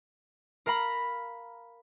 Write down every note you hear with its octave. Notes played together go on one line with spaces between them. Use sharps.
A#4 F5 A#5 B5